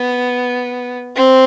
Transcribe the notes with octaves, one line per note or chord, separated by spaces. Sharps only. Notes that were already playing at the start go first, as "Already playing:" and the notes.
Already playing: B3
C4